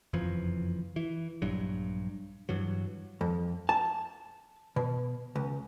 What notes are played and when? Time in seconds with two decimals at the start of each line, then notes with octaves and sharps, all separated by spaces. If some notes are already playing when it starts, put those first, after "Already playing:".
0.13 F#1 F2 E3 F3
0.96 E3
1.42 A#1 G2 F#3
2.49 G2 E3 F#3
3.21 F2
3.69 A5
4.76 B2
5.36 C#2